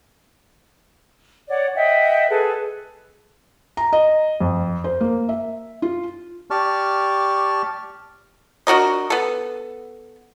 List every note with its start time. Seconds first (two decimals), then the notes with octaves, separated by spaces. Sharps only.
1.49 C#5 D5 F#5
1.75 D#5 E5 F#5 G5
2.29 G#4 A4 B4
3.77 A#5
3.93 D#5
4.40 F2
4.84 C5
5.00 A#3
5.29 E5
5.82 F4
6.50 G4 D5 A5 C#6 F6
8.67 D4 F#4 A#4 D#5
9.10 B3 A4